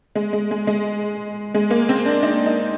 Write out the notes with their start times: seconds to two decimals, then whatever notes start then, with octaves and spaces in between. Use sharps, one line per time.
0.15 G#3
0.33 G#3
0.51 G#3
0.67 G#3
1.54 G#3
1.71 A#3
1.89 C4
2.06 D4
2.23 D#4
2.46 D#4